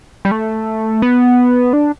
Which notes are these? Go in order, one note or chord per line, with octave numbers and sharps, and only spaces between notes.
G3
A3
B3
D4